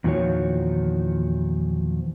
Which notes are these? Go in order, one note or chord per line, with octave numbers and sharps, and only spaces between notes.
E2 A#2 D#3 F3 F#4 C#5